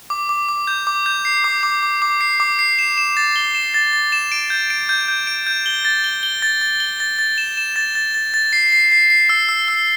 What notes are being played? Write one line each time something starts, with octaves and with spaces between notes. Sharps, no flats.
D6
D6
D6
G6
D6
G6
C7
D6
D6
D6
D6
C7
D6
C7
E7
E7
A6
G7
E7
A6
A6
E7
D7
G6
D7
G6
G6
D7
G6
G7
A6
G7
G7
A6
A6
G7
A6
A6
E7
E7
A6
A6
A6
A6
C7
C7
C7
C7
E6
E6
E6